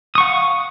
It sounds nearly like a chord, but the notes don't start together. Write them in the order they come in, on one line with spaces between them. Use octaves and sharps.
D#6 C#6 F#5 F5